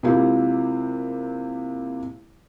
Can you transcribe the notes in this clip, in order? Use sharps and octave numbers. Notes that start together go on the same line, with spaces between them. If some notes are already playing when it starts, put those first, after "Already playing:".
C3 G#3 A#3 E4 F4 G4